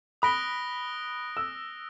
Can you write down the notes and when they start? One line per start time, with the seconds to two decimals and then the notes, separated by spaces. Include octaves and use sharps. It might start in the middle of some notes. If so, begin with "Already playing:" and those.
0.22 B5 D#6 F#6 A#6 D7 G7
1.37 E6